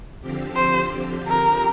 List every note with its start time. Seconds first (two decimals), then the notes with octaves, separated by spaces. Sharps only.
0.21 D3 F3 C4 G4
0.56 C5
1.28 A#4